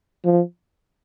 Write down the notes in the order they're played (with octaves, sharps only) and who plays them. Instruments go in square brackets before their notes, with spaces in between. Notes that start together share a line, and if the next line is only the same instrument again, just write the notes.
[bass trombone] F3